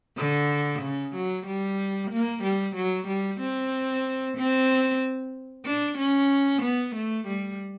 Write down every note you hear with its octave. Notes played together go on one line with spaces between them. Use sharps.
D3
C#3
F#3
G3
A#3
G3
F#3
G3
C4
C4
D4
C#4
B3
A3
G3